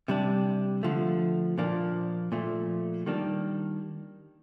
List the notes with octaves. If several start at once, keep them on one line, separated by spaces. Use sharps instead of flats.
C3 G3 D4
D3 F3 A3
A#2 F3 A#3 D4
A#2 F3 A3
D#3 G3 A#3 D4